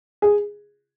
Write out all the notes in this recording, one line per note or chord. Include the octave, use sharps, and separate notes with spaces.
G#4